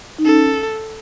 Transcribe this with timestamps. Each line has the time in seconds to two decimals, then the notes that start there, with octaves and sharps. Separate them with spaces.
0.18 D#4
0.25 C#4 A4